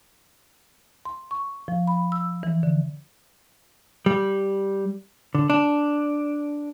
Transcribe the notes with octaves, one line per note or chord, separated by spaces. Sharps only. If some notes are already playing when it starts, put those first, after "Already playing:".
C6
C#6
F3
B5
E6
E3
D3
G3
D3
D4